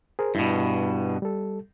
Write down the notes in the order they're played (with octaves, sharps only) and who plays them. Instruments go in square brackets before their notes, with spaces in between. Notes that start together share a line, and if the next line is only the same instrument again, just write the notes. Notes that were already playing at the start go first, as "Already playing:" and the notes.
[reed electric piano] G#4 A#4 C5
[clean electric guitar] G2 B2 [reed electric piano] E4
[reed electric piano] G3 A4